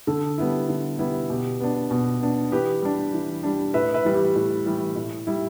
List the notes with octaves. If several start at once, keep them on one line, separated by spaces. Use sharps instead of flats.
D3 A4
G3 B3 E4
D3
G3 B3 E4
B2 G4
B3 D4
B2
B3 D4
E3 G4 B4
G3 D4
E3
G3 D4
A2 B4 E5
B4 E5
E3 G3
G4
A2
E3 G3
A2
G3 E4